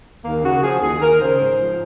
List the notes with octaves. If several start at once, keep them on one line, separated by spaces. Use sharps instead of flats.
D#2 A#3
C#3 F#4
F3 G#4
D#2 G#4
D#2 A#4
C#3 C5
G#2
F3